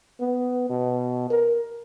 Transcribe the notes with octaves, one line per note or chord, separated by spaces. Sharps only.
B3
B2
A#4